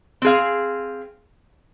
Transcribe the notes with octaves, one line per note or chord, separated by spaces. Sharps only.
C4 G#4 F5